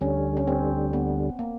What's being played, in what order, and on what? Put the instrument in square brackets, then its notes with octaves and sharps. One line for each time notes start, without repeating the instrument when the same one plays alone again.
[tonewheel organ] D2 D3 G3 [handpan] C#4
[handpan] C#4
C4
B3
A#3